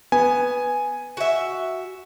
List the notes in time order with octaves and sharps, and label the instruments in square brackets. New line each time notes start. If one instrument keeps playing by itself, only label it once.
[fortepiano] B3 [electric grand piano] G#5
[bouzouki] F#4 E5